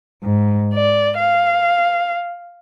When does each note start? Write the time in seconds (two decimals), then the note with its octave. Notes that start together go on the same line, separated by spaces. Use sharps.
0.24 G#2
0.74 D5
1.18 F5